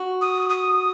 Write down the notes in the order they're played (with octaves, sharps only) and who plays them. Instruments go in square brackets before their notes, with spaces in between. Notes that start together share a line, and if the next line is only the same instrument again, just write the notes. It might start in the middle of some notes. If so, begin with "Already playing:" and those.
Already playing: [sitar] F#4
[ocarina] D#6
D#6